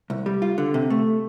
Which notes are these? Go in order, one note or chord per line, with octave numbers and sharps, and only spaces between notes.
C2
G3
F4
D3
C3
A3